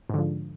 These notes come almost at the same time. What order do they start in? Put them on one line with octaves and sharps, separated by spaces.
G#2 D3 F3